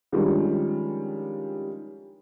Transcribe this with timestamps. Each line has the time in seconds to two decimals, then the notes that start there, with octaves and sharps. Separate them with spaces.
0.12 D#3 F3 G3 G#3 C#4 D4